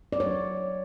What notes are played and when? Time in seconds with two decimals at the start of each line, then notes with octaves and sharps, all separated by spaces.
0.13 D5
0.20 F#3 C#5